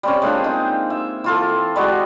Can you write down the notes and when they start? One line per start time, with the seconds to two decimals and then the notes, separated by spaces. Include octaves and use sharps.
0.03 G3 C4 C#4
0.22 G#3 A#3 D4 F4
0.44 C4 D#4
0.90 E5
1.24 E3 F4 A4
1.76 G3 G#3 F#4